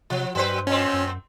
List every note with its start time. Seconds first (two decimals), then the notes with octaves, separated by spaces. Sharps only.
0.10 C3 F3
0.35 G2 F#3 B4 C5
0.67 A#2 C4 C#4
0.93 F#2